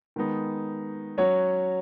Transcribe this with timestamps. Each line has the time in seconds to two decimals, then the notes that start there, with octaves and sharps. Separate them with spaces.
0.16 D#3 G#3 B3 D#4
1.18 F#3 C#4 F#4 C#5